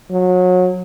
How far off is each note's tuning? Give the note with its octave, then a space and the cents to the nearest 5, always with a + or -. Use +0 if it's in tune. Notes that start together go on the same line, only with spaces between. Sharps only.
F#3 -25